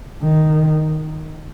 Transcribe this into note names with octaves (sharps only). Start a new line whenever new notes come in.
D#3